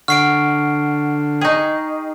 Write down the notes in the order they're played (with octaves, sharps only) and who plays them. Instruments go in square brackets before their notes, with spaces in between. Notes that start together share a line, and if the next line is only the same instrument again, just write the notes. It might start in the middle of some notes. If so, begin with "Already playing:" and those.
[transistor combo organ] D3 [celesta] F#5 C#6 [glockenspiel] F6 C7 D7
[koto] D#4 G#4 [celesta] G5 C#6